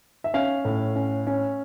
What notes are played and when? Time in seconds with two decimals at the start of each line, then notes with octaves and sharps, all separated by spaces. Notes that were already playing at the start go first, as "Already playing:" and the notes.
0.24 E5
0.34 C#4 F5
0.65 A2
0.96 C#4
1.27 C#4